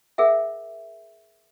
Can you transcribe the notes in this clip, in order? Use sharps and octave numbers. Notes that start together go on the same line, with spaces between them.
G#4 A#4 E5 F#5